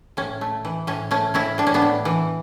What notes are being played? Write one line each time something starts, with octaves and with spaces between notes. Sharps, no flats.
A2 C#4
A3
E3
A2 C#4
A3 C#4
A2 C#4 E4
A2 D4
C#4
B3 D4
A2
E3